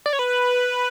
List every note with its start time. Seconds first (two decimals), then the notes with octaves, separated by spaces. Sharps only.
0.06 D5
0.13 C#5
0.19 B4